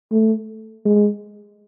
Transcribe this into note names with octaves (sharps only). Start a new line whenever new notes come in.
A3
G#3